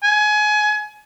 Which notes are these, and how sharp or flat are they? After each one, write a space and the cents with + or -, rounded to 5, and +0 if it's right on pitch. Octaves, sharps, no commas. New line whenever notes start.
G#5 +25